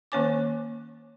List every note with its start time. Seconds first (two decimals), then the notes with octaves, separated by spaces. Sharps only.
0.12 D#3 A#3 C#4 C#5 G#5 D6